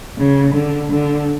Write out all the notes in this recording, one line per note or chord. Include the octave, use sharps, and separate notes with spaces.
C#3
D3
D3